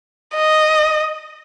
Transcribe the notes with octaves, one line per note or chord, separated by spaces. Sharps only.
D#5